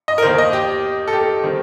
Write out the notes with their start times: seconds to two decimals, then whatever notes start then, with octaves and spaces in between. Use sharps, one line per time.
0.08 D#5
0.18 A#4
0.22 D#2 D#3 A#3 C5
0.38 D#5
0.53 G4
1.08 A4
1.13 G4
1.43 D#3 G3 C4